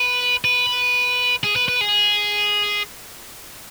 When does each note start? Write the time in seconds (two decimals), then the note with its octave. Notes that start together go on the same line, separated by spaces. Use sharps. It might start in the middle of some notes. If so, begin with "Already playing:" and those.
Already playing: B4
0.45 B4
1.44 G#4
1.56 B4
1.68 B4
1.81 G#4